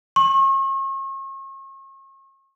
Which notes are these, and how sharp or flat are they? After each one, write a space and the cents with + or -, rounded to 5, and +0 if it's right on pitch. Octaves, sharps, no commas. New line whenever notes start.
C#6 -40